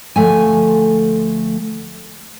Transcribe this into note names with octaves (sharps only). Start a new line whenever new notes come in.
D2 F3 A3 G#5